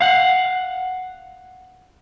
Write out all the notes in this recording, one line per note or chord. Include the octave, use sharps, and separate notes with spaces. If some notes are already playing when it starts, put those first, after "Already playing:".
F5 F#5